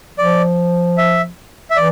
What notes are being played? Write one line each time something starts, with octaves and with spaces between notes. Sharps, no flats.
F3 D5
E5
E5
E3 D5